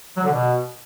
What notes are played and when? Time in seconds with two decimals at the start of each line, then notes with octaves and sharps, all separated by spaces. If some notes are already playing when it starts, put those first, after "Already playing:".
0.17 F#3
0.24 D3
0.32 B2